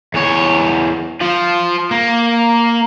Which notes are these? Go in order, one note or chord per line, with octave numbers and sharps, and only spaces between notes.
E2 C#5
F3 F4
A#3